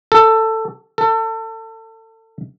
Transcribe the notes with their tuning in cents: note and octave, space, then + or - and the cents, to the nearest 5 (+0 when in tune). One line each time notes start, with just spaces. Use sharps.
A4 +15
A4 +30